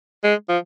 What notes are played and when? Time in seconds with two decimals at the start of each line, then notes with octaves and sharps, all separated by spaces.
0.24 G#3
0.49 F3